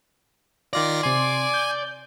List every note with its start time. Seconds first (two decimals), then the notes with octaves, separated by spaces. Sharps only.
0.73 D#3 F4 D5 A#6
1.03 C3 G#5 C6
1.54 G6